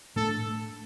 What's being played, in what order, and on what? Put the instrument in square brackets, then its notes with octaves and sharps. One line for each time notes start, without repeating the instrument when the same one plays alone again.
[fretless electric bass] A2 A3 D4 [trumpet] A4